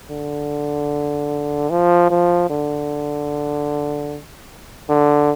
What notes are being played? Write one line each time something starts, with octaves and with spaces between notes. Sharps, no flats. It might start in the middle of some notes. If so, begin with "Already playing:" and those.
D3
F3
F3
D3
D3